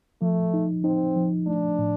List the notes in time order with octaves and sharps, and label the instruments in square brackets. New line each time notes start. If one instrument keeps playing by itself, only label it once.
[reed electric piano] F3 [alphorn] A3
[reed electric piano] D#4
[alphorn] C4 [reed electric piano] D#4
[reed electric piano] F3
[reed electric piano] A3 [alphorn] D4
[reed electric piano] A2